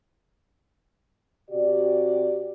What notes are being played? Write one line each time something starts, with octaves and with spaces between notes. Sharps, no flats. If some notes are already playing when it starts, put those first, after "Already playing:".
C3 F#4 G4 D5